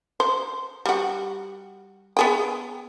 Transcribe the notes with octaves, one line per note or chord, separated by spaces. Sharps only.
C5
G3 F#4
B3 G#4 G5